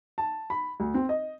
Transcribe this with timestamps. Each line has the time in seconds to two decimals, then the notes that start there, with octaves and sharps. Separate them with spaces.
0.18 A5
0.50 B5
0.80 D2
0.94 C4
1.09 D#5